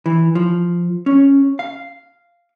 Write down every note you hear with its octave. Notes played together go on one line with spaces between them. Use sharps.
E3
F3
C#4
F5